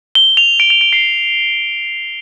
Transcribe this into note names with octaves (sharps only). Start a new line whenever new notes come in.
G7
F7
D7
F7
D7
C7